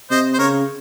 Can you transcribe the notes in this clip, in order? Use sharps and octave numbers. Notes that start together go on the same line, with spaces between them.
C3 C5 D#5
C5
C#3 A#4 C#5